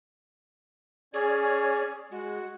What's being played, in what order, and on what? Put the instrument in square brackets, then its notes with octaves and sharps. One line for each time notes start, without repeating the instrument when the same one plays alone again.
[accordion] C#4 C#5 D5 [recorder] G#4
[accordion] G#3 [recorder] F#4